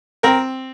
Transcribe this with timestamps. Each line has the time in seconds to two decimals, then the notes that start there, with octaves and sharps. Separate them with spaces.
0.23 C4 A#4